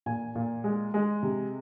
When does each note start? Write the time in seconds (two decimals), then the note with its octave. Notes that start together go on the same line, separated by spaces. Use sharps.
0.06 A#2 G#5
0.35 A#2
0.64 G#3
0.94 G#3
1.23 C3